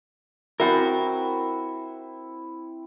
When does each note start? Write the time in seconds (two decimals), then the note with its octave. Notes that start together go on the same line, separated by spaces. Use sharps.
0.60 C4 E4 F#4 A#4